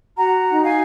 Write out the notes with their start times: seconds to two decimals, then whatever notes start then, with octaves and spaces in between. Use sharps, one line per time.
0.16 F#4 F#5 A#5
0.48 D#4
0.63 F5 G#5